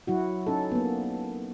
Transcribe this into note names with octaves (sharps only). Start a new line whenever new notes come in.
F#3 E4 F#4
C#4 D#4 A4
A#3 B3